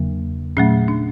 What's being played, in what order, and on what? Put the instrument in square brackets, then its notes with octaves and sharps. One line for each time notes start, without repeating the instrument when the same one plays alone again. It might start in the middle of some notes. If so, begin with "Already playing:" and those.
Already playing: [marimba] E2 C#3 F#3 A#3
A#2 F#3 A3 C#4
D4